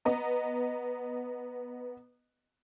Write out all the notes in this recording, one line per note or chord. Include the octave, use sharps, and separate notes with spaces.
B3 D#5 A#5